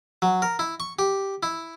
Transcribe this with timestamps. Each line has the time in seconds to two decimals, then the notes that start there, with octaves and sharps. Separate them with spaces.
0.22 F#3
0.42 A#4
0.59 E4
0.80 C#6
0.99 G4
1.43 E4